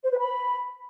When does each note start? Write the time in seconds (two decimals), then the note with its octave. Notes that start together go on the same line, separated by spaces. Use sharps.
0.04 C5
0.11 B4
0.18 B5